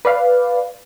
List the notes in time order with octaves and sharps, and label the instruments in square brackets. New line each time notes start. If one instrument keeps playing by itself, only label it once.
[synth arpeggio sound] B4 D5 F5